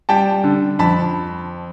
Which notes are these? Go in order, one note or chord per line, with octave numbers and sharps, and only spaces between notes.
G3 G5 A5
D3
F2 A5 B5